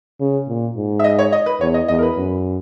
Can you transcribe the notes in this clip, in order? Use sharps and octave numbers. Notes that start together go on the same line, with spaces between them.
C#3
A#2
G#2
E5
D#5
C#5
D#5
B4
E2 C#5
D#5
E2 D#5
A#4
B4
F#2